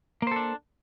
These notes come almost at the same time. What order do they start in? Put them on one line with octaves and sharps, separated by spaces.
A#3 C5 A4 D4